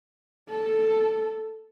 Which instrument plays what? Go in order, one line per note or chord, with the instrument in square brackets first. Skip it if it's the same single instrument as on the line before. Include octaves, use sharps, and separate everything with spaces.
[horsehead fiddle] A4